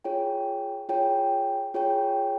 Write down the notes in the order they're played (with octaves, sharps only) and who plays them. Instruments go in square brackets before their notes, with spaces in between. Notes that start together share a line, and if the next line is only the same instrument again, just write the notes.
[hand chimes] F4 G#4 C#5 G5
F4 G#4 C#5 G5
F4 G#4 C#5 G5